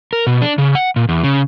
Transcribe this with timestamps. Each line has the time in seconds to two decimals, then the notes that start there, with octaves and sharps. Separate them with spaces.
0.13 A#4
0.27 B2
0.42 D4
0.58 C#3
0.75 F#5
0.96 A#2
1.09 E2
1.24 C#3